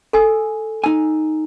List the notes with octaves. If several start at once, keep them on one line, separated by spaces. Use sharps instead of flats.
A4 G#5 E6
D#4 G#5 E6